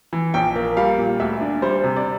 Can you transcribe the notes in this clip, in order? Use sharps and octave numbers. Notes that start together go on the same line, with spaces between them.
E3
A#1 G5
A#3
G3 F5
A#2
D2 E5
D4
G3 C5
C3
D5